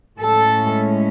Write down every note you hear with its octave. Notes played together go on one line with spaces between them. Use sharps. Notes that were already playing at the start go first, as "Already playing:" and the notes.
A2 G#3 C#4 A4